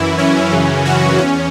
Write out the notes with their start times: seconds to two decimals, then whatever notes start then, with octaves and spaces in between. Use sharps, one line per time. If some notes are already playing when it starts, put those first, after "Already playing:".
Already playing: F#2 E3 E4
0.18 C#4
0.51 F#2 C#3 E3
0.85 F#4
1.18 E2 C#4